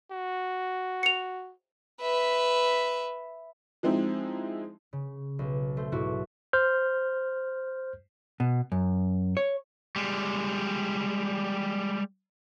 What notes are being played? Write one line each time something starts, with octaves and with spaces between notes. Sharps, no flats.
F#4
C#7 F7
B4 E5
F3 G#3 C4 D#4 E4
C#3
B1
A3 C5
B1 G#2 E4 F#4
C5 F6 G6
B2
F#2
C#5
G3 G#3